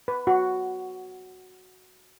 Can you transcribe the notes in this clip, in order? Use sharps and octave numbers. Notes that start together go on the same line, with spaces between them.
B4
F#4